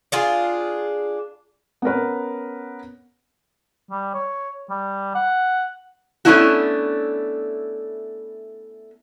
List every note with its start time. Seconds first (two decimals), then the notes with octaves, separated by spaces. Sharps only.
0.12 D4 F4 G#4
1.82 B3 C#4 A#4 B4
3.91 G3
4.14 C#5
4.70 G3
5.15 F#5
6.25 A3 B3 C#4 D4 E4 F#4